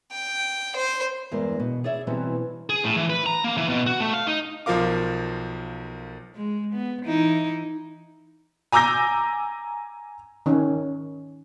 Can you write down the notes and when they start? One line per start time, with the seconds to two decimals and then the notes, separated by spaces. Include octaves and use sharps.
0.12 G5
0.76 C5
1.31 E2 G2 G#3 A#4
1.60 B2
1.84 G#4 C#5 D5 E5
2.07 B2 E3 F#3 G3 C4 C#4
2.70 G#4
2.85 A2
2.96 E3
3.10 B4
3.26 A#5
3.44 A#3
3.57 E3
3.69 B2
3.87 F#4
4.00 A3
4.14 F5
4.27 D#4
4.66 B1 F3 F4 A#4 F5 D6
6.35 G#3
6.73 B3
7.05 E3 D#4 E4
8.72 G#5 A#5 D6 E6 G6 A#6
10.46 D#3 C#4